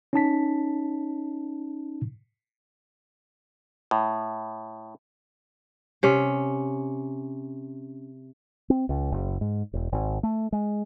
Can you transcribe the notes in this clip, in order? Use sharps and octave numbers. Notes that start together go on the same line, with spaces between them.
C#4 D#4 A5 B6
A2
C3 C#4
C4
C#2
F#1
G#2
E1
G#1
A3
G#3